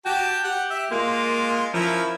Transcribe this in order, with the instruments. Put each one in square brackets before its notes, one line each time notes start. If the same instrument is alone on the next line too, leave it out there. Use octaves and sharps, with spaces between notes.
[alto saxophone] F#4 [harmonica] G4 G5 A5
[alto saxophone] G4 [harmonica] F#5
[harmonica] E5
[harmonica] G#3 F4 [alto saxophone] A#3
[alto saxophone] F3 [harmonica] C#4 E4 A#4